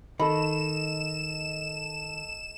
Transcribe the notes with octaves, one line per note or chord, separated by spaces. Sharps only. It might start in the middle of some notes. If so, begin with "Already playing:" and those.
D#3 A4 D#5 B5 E7